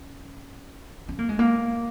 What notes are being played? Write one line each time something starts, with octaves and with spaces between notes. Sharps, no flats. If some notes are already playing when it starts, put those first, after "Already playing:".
Already playing: C#4
C#4
A#3
G#3
A#3